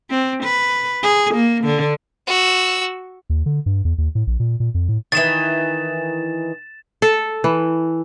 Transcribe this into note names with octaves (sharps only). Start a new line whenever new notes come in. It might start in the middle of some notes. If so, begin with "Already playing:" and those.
C4
B4
G#4
A#3
D3
F#4 E6
D#2
D3
G2
E2
D#2
A2
A#1
A#2
A#2
F2
A2
D#3 E3 A6 E7
A4
E3